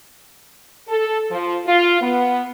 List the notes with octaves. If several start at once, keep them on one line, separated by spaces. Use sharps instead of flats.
A4
F3
F4
B3